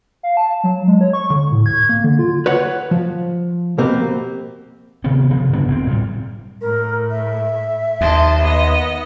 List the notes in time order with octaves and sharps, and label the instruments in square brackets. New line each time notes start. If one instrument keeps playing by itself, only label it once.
[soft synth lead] F5
A5
F#3
G#3
C#5
C#6
D3
A2
G#6
A#3
D3
F4
[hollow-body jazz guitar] B4 C#5 F#5
F3
B2 A#3 C4 G4
[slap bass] C3 D#3 B3 C4
C3 F3
G2 D3 B3 D4
G1 A#2 C4
A2 G3
[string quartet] A2 [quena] A#4
[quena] E5
[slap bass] D#2 [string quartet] D#5 A5 C6
[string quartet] B3 D#5